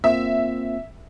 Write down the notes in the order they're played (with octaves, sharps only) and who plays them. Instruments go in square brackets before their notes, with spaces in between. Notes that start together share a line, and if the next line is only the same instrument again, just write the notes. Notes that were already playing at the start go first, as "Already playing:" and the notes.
[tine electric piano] A#3 C4 F4 [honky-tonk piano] E5